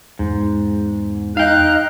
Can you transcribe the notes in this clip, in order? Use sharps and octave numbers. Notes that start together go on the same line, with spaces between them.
E2 G#2
D#4 D#5 F5 G5 F#6